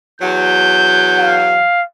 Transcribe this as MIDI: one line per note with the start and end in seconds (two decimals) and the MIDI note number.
0.21 1.61 40
0.21 1.61 54
0.21 1.45 91
1.18 1.83 77